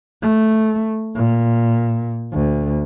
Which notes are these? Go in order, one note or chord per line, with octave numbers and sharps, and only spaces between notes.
A3
A#2
D2